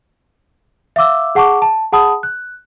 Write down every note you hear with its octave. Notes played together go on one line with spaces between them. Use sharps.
E5 F5 D6 E6
G#4 F#5 A5 C#6 D6
A5
G#4 F#5 A5 B5 D#6
F#6